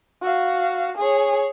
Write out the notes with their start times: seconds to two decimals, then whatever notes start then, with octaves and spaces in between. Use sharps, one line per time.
0.22 F#4 F5
0.97 G#4 C#5